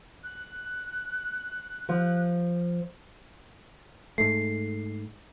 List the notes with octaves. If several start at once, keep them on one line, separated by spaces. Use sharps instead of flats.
F#6
F3
G#2 A3 C7